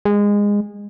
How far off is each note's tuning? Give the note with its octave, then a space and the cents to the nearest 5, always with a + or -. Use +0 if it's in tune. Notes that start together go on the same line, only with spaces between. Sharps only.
G#3 -20